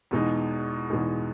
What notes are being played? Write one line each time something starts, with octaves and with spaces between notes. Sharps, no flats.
E2 B2 G#3 D#4
E2 B2 G#3 D#4